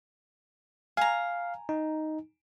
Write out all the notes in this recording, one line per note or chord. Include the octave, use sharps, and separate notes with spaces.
F5 G#5 A#5
D#4